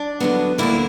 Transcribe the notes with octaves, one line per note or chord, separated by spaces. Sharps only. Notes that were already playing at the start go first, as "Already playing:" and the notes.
Already playing: D4
E2 D3 F#3 B3
D2 D3 A#3 E4